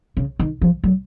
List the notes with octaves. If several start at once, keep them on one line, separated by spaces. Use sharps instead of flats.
C#3
D#3
F3
F#3